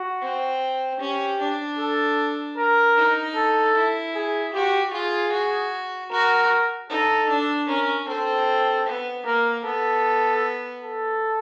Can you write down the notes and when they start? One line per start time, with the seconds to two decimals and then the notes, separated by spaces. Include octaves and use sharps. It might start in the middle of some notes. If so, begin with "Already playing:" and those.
Already playing: F#4
0.22 C4
1.00 C#4 G4
1.40 D4
1.79 A4
2.58 A#4
2.97 D#4
3.36 A4
3.75 E4
4.15 G#4
4.54 F#4 G4
4.93 F4 G#4
5.32 F#4
6.11 F#4 A#4
6.90 D#4 A4
7.29 D4
7.68 C#4 A#4
8.08 C4 A4
8.86 B3
9.26 A#3 A#4
9.65 B3 A4
10.83 A4